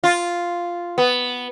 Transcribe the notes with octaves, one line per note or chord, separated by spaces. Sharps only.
F4
B3